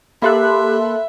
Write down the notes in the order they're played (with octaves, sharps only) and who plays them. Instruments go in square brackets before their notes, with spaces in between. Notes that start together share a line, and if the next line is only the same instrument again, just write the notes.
[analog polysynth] A#3 A4 [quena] G4 [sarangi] E5 [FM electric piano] B5 C6 F#6